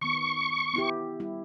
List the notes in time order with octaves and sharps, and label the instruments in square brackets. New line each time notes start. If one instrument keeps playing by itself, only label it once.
[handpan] D#3 B3 [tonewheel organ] C#6
[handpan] B3 E4 G4
G3 E4